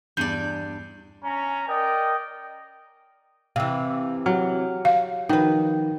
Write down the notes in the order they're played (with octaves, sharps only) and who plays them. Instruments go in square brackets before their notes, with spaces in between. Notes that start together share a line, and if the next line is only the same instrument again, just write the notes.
[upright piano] E2 D#7 G7 [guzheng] G2 D5 [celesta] G6
[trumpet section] C#4 A#5
A#4 D5 D#5 G5
[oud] C3 E3 [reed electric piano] F5 G5 E6
[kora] F#3 [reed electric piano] G4 F6
[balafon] F5
[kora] D#3 [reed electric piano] F3 D#4 [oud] F#4 B4